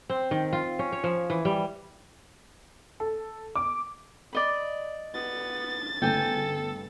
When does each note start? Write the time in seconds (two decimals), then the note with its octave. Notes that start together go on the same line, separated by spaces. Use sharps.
0.10 C4
0.31 D#3
0.53 F4
0.79 C#4
0.92 C#5
1.04 F3
1.30 E3
1.45 G3
3.00 A4
3.56 D6
4.33 D5 D#5 B5
5.15 B3 A6
6.02 G1 C#3 A3 A4 G5 G#5